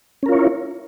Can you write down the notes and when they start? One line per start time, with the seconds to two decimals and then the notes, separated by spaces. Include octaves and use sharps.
0.23 C#4
0.26 A#4
0.29 F4
0.32 C#5
0.35 E4